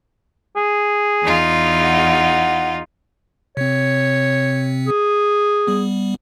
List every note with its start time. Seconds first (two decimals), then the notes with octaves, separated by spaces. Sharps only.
0.56 G#4
1.22 E2 D#4 F4
1.84 F#5
3.57 C3 C4 C#5
4.87 G#4
5.67 G3 B3